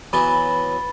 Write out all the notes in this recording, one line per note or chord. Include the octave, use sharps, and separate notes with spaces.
E3 F#3 B3 B5 A6 G7